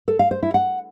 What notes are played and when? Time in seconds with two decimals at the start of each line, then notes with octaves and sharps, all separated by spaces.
0.08 A4
0.19 F5
0.31 C5
0.43 E4
0.54 F#5